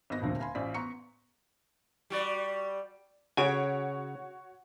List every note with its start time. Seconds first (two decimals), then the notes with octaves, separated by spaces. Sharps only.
0.10 G#1 B3 D#5 A#6
0.22 D#1 D2 D3 F3 C4
0.40 F5 G#5 B5 C6
0.55 A1 C#4 F4 C5 D5 B6
0.74 B3 A#5 C6 C#6 C#7
2.10 G3 F#4 D5
3.37 C#3 F#4 C#5 G#5 D7